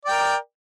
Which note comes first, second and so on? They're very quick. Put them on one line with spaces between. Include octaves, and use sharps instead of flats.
D5 G5 A#4